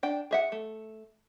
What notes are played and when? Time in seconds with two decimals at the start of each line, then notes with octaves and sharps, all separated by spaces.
0.03 D4 G5
0.31 G#4 E5 F#5
0.52 A3